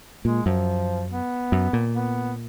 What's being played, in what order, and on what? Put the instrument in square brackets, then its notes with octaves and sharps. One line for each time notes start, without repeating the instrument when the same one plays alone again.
[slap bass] A#2 [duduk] G#3
[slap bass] F#2 [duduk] F3
[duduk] B3
[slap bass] F#2
A#2
[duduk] B3